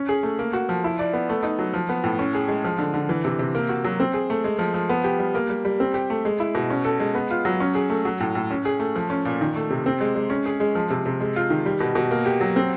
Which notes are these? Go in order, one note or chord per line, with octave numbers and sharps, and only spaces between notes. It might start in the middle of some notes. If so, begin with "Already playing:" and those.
Already playing: C#4
G#4
A3
A#3
F#4
F3
E4
D5
B3
A3
D#4
F#3
F3
B3
A2
C#4
G#4
G#3
F3
D3
D3
E3
C3
C3
A#3
F#4
F#3
C4
G#4
A3
G#3
F3
F3
B3
G4
G3
A#3
G3
G3
C4
G4
A3
G#3
E4
B2
C#4
A4
G#3
B3
F4
F#3
C#4
G#4
A3
F#3
A2
A2
C#4
G#4
A3
F3
C#4
A#2
D#3
A3
C3
C4
G#3
G#3
C#4
G#4
G#3
F3
C3
C3
G#3
F4
D#3
G3
B2
B2
A#3
G4
F#3
C4